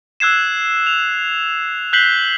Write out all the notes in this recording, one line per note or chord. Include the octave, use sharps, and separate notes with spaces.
E6 F#6 G#6 C7 E7
F7
F#6 G6 B6 C7 F#7 G7